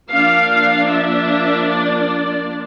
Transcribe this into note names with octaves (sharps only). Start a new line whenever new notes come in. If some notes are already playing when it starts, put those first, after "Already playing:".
F3 A#3 D4 F5
E5
D5